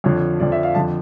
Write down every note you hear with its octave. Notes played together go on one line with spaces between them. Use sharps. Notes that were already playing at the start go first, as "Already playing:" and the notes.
F2 D3 F3 C#5
F2 D3 F3 D5
E5
F5
F2 D3 F3 A5